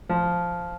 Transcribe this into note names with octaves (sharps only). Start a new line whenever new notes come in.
F3